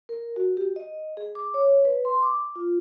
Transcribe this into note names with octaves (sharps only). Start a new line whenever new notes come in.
A#4
F#4
G4
D#5
G#4
D6
C#5
B4
C6
D6
F4